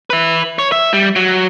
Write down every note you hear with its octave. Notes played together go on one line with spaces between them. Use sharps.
E4 B4
C#5
E5
G3
F#3